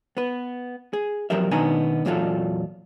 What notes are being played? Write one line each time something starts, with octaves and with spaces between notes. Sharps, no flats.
B3 B4
G#4
E2 F3 F#3 G4 A#4 E5
B2 D#3 B3 D4 G#5 A#5
E2 A#2 E3 F#3 F4 A4